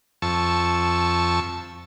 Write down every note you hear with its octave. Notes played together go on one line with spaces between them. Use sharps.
F2 A5 C#6 E6